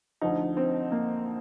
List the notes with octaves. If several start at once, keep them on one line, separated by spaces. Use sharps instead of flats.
D2 D3 F3 D#4
C4
A#3